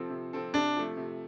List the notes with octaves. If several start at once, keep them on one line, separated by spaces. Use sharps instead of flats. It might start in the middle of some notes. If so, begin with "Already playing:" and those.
Already playing: C3 F3 C4 A4
C3
F3 C4 A4
C3 D4
F3 A3
C3